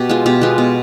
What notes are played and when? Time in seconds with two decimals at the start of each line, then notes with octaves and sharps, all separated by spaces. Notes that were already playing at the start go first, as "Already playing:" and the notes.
Already playing: B2 G4
0.09 G#3 B3 F4
0.26 B2 G4
0.41 G#3 B3 F4
0.58 B2